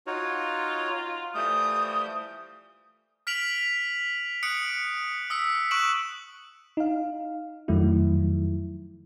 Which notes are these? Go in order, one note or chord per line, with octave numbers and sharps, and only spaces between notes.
D#4 F4 F#4 C#5
E3 F3 G3 A3 D#6 G6
F6 B6 D7 F7 F#7
D#6 F#6 C#7 D7 F#7
D#6 E6 B6 C#7
C#6 F#6 D7 E7 F#7
D#4 F5
F2 D#3 F3 F#3 A3 E4